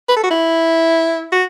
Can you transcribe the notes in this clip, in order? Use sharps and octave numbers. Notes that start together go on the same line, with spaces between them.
B4
A4
F#4
E4
F#4